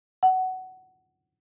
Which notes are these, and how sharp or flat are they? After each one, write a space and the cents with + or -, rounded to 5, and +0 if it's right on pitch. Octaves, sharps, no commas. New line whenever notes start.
F#5 +15